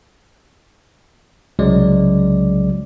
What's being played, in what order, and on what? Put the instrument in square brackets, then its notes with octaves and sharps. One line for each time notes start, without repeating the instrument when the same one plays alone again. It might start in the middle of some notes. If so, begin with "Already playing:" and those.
[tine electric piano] C2 C#3 F#3 G#3 D5